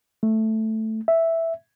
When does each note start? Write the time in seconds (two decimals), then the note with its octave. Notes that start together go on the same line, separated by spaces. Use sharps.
0.23 A3
1.08 E5